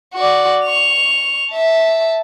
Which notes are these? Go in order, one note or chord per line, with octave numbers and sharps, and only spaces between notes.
F#4 D5
C#6 F7
E5 A5